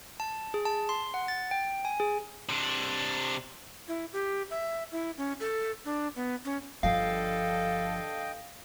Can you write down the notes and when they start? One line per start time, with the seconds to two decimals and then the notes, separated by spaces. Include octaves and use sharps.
0.20 A5
0.54 G#4
0.65 A5
0.89 C6
1.14 F#5
1.28 A6
1.51 G5
1.85 G#5
2.00 G#4
2.49 C3 D4
3.88 E4
4.13 G4
4.51 E5
4.92 E4
5.18 C#4
5.40 A4
5.85 D4
6.16 B3
6.45 C#4
6.83 G1 G2 D3 F3 A4 D#5 F5 G5